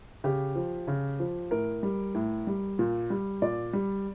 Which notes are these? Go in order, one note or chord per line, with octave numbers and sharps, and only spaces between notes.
C#3 G4
F3
C#3
F3
A2 A#4
G3
A2
G3
A#2
G3
A#2 D5
G3